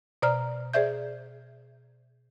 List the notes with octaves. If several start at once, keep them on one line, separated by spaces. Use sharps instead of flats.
B2 C5 D5 A#5 F6
G#4 C5 D5 E5 G6